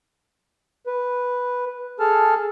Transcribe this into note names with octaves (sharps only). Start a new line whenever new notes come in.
B4
G#4 A4 A5 F6